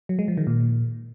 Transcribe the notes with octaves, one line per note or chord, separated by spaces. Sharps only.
F#3
G#3
F3
D#3
A#2